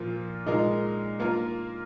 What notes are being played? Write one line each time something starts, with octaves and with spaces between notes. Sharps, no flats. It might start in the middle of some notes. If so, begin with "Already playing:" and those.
Already playing: A#2 F3 A#3 F4
A#2 G#3 D#4 A#4
A#3 F4 A#4